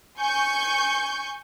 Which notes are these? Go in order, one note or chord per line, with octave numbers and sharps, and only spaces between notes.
G#5 C#6 G6